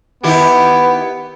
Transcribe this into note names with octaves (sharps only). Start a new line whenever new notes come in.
D#3 B3 E4 G4